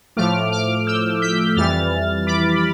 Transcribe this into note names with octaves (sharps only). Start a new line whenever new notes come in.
A2 F3 A3 D6 F6
D6 F6
E6 G6
G6 B6
F2 E3 G3 F6 A6
B5 D6
B5